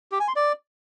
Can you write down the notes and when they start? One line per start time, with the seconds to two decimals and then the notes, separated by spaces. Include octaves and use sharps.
0.12 G4
0.20 G#5
0.28 C6
0.36 D5